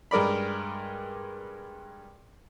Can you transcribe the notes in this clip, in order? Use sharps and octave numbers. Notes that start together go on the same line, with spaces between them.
G2 G#3 A#4 D5 B5